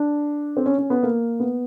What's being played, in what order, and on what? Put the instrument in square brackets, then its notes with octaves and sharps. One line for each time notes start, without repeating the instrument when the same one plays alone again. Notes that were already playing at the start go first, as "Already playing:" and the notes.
Already playing: [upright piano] D4
C4
C#4
C#4
B3
A#3
B3